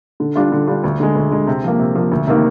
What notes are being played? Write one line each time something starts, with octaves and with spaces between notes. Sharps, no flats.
D3
G3 D4 F4
D3
G3 D4 F4
D2
D3 G#3
D2
D3 G#3
C3
F3 A#3
C3
F3 A#3
D2
C3 D#3 A#3